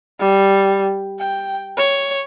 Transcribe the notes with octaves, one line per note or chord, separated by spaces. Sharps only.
G3
G5
C#5